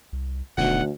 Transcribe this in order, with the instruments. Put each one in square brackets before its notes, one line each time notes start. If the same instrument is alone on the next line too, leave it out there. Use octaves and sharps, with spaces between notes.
[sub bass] C2
[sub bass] D#1 [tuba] D2 [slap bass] B2 D#3 [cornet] F#5